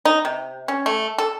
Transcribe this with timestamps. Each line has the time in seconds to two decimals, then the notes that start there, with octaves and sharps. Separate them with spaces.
0.05 D#4
0.25 C3
0.68 C#4
0.86 A3
1.18 A4